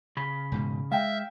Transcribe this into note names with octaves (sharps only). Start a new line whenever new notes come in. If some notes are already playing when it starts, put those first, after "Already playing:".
C#3 B5
E1 G#2 B2
G#3 E5 F5 G5